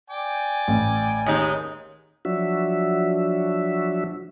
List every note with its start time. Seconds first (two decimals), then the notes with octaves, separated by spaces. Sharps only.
0.10 D5 G5 G#5 D6
0.68 A1
1.26 D#2 G#3 D#4
2.25 F3 F#3 D4 F#4 E5